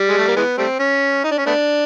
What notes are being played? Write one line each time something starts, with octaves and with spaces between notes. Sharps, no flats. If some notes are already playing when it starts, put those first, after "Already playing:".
Already playing: G3
G#3
A3
A#3
E3 G#3 B3
G3 A3 C4
C#4
D#4
D4
C#4
A3 B3 D4